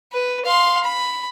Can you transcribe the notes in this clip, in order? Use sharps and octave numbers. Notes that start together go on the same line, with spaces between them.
B4
F5 C6
B5